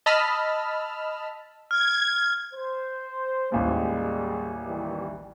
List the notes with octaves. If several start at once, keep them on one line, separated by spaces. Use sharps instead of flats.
D#5 A5 B5 E6 F6
F6 G#6
C5
A1 D#2 G3 G#3
D#3 E3 G3